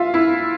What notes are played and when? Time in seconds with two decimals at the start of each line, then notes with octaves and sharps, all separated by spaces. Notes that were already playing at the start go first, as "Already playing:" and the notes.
Already playing: F4 E5 F5
0.14 E4